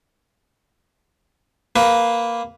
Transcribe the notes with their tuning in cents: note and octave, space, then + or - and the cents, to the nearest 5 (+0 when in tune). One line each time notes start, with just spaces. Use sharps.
A#3 +0 B4 +0